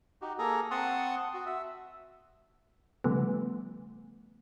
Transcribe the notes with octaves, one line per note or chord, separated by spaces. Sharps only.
D#4 F#4 G4
A#3 G#4 A4 A#5
C4 F#5 A5 C6 C#6 D#6
F#4
E5
C#3 F3 G3 A3 B3